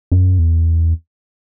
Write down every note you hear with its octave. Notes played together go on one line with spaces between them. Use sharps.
F#2
E2